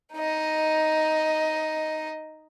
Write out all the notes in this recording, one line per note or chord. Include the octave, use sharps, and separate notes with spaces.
D#4 D#5